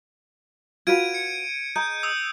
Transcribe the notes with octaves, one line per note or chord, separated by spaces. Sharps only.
F4 F#4 B4 G#6 D7 D#7
C#7
G#4 D#5 A#5 G6
D#6 E6